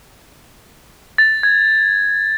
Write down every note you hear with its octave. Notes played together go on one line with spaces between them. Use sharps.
A6
G#6